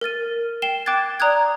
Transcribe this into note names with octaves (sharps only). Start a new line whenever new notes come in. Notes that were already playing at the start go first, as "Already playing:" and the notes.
A#4 F6 A6 D#7
G5 C7 E7 G7
G5 D6 F#6 G#6 A6
D5 A#5 D#6 F#6 G#6